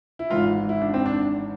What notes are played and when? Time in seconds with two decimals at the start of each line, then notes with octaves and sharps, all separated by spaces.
0.19 E4
0.30 G#1 G#2 E3 F4
0.69 E4
0.82 D4
0.94 C4
1.06 D4